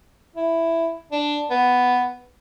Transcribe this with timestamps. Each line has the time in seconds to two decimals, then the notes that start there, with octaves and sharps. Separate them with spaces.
0.36 E4
1.12 D4
1.51 B3